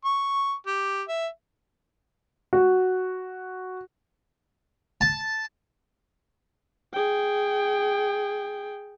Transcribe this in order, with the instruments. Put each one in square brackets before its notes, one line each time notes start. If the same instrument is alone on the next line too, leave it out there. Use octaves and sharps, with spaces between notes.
[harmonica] C#6
G4
E5
[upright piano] F#4
[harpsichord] A5
[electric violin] G#4 G5